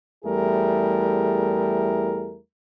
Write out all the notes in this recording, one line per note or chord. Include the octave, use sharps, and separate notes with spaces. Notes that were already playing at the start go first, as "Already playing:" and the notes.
E2 G3 A3 E4 G#4 A#4